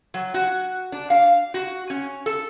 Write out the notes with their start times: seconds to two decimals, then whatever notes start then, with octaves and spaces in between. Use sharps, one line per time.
0.14 F#3
0.34 F#4
0.92 D4
1.10 F5
1.54 F#4
1.90 C#4
2.26 A4